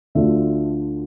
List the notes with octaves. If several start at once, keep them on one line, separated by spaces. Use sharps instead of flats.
D2 D3 A3 D4 F4 E5